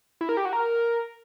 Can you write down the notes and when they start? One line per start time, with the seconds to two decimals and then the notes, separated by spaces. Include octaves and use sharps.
0.21 E4
0.29 A#4
0.37 G4
0.45 F#4
0.53 A#4